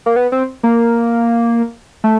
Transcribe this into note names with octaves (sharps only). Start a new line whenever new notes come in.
A#3
B3
C4
A#3
A3